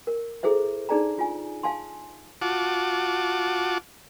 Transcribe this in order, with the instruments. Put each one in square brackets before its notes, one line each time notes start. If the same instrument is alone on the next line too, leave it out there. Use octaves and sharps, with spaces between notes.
[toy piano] A#4
E4 G#4 A4 C5 E5
D4 D#4 G#4 D5 A5 A#5
F4 G#5
F5 G#5 A5 C6
[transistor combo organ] F4 F#4 F#5 A5 D6